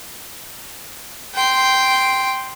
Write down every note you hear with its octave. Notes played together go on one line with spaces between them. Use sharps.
G5 C6